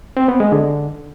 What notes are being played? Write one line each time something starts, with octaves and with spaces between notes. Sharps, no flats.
C4
B3
G#3
D3